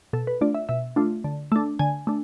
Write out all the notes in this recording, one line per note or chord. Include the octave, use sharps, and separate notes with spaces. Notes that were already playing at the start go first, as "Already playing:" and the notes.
B2 A4
B4
A3 D4 F4 D5
E5
B2 E5
A3 D4 F4
D3
A3 D4
D3 G#5
A3 D4